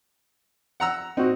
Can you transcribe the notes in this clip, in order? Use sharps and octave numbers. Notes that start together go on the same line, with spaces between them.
F#5 A#5 E6
C4 D#4 F#4